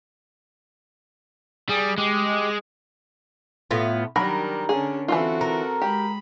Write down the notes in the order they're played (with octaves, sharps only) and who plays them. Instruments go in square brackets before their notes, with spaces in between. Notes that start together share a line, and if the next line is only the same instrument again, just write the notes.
[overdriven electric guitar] G3 [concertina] G#4
[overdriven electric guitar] G#3 [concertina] G4
[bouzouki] A2 B3 F4
[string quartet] D#3 G3 D4 [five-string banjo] F#3 B5 [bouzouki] A#4
[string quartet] D3 C#4 D4 [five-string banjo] G#4
[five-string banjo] E3 F#3 F4 [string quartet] C4 F#4 A4
[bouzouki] A#4
[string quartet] G#3 B5 [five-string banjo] G4